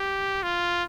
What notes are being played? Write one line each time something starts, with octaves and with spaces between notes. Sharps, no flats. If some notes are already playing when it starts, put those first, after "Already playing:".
Already playing: G4
F4